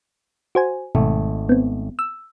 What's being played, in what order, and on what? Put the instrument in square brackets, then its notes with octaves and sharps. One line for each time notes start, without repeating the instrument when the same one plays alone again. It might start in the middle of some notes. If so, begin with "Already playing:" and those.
[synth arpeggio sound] F#4 C5 G#5
[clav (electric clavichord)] G#1 A3 [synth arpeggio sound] B2
[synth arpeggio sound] B3 C4
E6